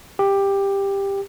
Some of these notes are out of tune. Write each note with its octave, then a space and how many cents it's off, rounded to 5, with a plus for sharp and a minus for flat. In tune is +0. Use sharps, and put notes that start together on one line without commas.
G4 +10